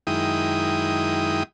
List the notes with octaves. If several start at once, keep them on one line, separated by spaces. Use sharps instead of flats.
F#2 D#3 G#3 E4 G5 D#6